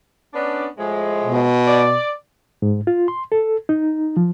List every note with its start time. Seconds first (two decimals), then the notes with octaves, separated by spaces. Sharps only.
0.34 B3 C#4 D4
0.78 A2 F3 G#3
1.24 B2
1.67 D5
2.62 G#2
2.87 F4
3.08 C6
3.32 A4
3.69 D#4
4.17 F3